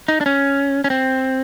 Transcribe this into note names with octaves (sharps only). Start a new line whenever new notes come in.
D#4
D4
C#4
C#4
C4